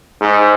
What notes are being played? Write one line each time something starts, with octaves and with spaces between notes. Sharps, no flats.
G#2